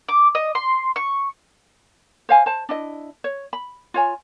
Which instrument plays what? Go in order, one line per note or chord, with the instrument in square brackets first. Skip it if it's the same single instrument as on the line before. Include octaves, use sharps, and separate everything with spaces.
[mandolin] D6
D#5
C6
C#6
[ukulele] C5 F5 G#5
C5 A5
D4 E4 D#5
C#5
B5
F4 C#5 G#5